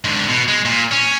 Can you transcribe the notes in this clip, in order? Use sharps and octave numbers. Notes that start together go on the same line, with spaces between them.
G#2 D3
B2
G#3
A#2
C#4